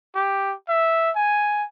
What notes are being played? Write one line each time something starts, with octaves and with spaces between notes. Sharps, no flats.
G4
E5
G#5